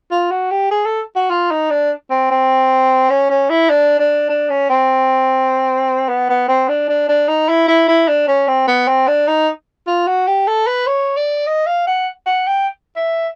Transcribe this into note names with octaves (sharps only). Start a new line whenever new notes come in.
F4
F#4
G4
G#4
A4
F#4
F4
D#4
D4
C4
C4
C#4
C#4
E4
D4
D4
D4
C#4
C4
B3
B3
C4
D4
D4
D4
D#4
E4
E4
E4
D4
C#4
C4
B3
C4
D4
D#4
F4
F#4
G4
A4
B4
C#5
D5
D#5
F5
F#5
F#5
G5
E5